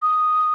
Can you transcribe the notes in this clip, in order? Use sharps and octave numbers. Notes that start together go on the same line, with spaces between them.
D#6